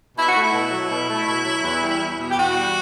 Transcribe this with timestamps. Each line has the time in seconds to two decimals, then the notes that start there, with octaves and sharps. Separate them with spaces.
0.16 B2 E4
0.28 F#4
0.34 A3
0.40 E4
0.53 B2
0.71 F#3
0.90 B2
1.08 A3
1.26 B2
1.45 F#3
1.63 E2
1.81 G3
2.00 E2
2.18 B2
2.29 G4
2.35 E2 F#4
2.54 G3